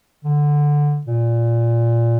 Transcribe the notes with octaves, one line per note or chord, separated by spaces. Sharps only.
D3
A#2